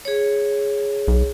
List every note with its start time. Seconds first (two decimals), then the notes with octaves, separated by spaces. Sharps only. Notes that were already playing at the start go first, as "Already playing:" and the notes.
0.05 G#4 C#5
1.08 B1